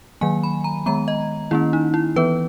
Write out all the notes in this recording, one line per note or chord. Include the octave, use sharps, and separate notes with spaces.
D#3 F#3 A#3 G#5
B5
A#5
D#3 G#3 B3 A#5
D#5
D#3 A#3 C#4 E4
D#4
E4
E3 B3 B4